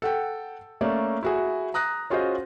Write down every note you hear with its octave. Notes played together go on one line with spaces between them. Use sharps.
A4 F#5 G5
A3 A#3 C#4 D5
E4 F#4 G#4
A#5 D#6 F#6 A#6
C#4 F4 F#4 G#4 C5 D#5